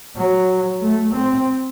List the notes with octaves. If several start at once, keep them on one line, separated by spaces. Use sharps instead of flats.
F#3
A3
C4